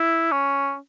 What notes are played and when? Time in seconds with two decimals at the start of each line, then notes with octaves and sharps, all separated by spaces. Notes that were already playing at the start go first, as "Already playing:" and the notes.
Already playing: E4
0.32 C#4